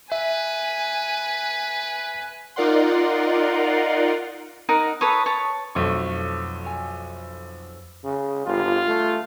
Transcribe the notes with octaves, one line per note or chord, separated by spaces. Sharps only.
B4 E5 G#5
D#4 F4 A#4 D5 F#5 C6
D#4 A#4 F#5 A#5
A4 B4 C#5 D#6
C#5 A5
B1 F2 F#3 A3 C#6
C#5 G#5
C#3
G1 F4
A3